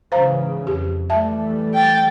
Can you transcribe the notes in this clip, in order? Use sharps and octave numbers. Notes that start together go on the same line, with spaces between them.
G#2 C#3 E3 C5 F5 A#5
F2 G4
E3 G3 A3 E5 A5
G5 A6